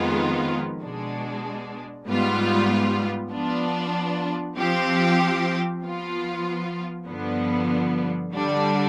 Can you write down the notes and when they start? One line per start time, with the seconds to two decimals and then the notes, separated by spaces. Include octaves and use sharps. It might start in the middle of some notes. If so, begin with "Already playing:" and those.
Already playing: F2 D#3 G#3 B3 F4
0.81 B2 G#3 D4
2.06 G#2 G3 B3 F4
3.31 F3 B3 D4 F4
4.57 F3 C4 G4
5.82 F3 B3 F4
7.07 G2 D3 F3 B3
8.32 D3 G3 D4